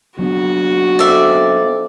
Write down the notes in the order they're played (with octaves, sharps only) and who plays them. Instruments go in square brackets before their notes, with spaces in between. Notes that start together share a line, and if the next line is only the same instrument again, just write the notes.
[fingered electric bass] F#3 B3 D4 [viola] F#4
[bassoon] F2 [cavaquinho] D5 E5